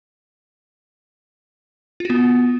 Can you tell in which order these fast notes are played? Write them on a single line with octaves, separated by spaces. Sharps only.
F4 F#4 B3